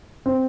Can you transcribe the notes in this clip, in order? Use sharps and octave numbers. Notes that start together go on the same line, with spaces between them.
C4